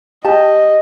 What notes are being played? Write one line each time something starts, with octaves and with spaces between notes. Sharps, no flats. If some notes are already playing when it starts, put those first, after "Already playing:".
G4 D#5 A5